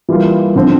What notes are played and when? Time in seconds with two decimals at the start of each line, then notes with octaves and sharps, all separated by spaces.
0.09 E3 G3 A#3 F4
0.56 D3 F3 C4